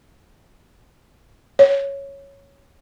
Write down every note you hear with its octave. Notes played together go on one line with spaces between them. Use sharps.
C#5